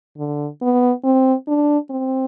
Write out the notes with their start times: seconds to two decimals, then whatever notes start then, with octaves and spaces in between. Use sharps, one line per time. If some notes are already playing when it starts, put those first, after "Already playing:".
0.18 D3
0.62 B3
1.04 C4
1.48 D4
1.90 C4